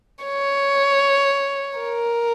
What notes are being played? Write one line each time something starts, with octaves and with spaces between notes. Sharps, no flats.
C#5
A#4